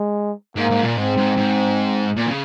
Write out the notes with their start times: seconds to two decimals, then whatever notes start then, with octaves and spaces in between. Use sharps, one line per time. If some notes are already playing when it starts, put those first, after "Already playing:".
Already playing: G#3
0.56 G#2 A#3
0.71 G#2
0.83 A#2
0.96 G#2 C4
1.17 G#2
1.37 G#2
2.17 A#2
2.27 E3
2.30 C#3